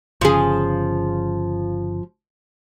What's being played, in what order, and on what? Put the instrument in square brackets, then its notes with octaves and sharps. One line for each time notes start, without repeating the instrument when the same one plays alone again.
[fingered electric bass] G1 C#3 [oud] F3 G#4